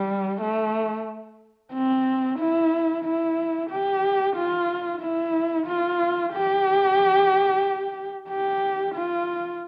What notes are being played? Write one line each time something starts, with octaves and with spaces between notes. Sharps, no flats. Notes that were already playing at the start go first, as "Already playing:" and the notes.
Already playing: G3
A3
C4
E4
E4
G4
F4
E4
F4
G4
G4
F4